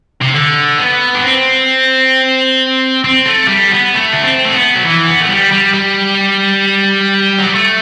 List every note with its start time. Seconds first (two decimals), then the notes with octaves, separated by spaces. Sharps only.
0.21 C3
0.34 D3
0.78 B3
1.15 D4
1.23 C4
3.04 C4
3.26 A3
3.48 G3
3.72 B3
3.94 A3
4.13 D4
4.24 C4
4.45 A3
4.55 B3
4.75 F#3
4.85 E3
5.07 B3
5.21 A3
5.29 G3
5.52 G3
5.74 G3
7.39 F#3
7.47 G3
7.55 A3